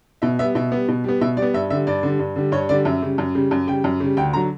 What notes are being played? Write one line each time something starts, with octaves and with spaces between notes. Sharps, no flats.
B2 E5
G3 B3 E5
B2 E5
G3 B3
B2
G3 B3
B2 E5
G3 D5
B3
G2 E5
D3 G3 E5
G2 D5
D3 G3
G2
D3 G3
G2 C#5
D3 G3 D5
F#2 E5
C#3 G3
F#2
C#3 G3
F#2
C#3 G3 G5
F#2
C#3 G3
D2 G5
D3 F#3 A#5